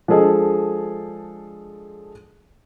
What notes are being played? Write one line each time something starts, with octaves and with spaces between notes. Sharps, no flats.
F3 G#3 D4 G#4 A4 D#5